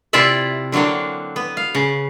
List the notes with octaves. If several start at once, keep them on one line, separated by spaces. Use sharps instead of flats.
C3 E4 F4 D5 E5
D3 F#3 A#3 C4 D4
B3
F5
C#3